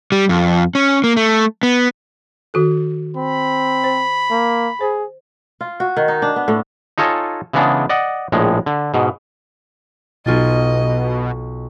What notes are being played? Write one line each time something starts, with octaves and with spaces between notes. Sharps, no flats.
G3
F2
C#4
A#3
A3
B3
D#3 F#4 A4
C4 B5
C5
A#3
G#4 C5
F4
F#4
D#3
D#4
D4
B3
A2
D#4 F4 A4 C#5 D#5 G#5
C#3 E3 G#3 B3 D4
D5 D#5 F#5
A#1 A2 G#3
D3
G#2 B2
B1 B2 F4 D#5 A6